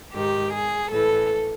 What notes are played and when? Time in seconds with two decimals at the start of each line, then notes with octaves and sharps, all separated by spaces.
0.14 G#2 D#3 G4
0.53 G#4
0.90 A2 E3 A4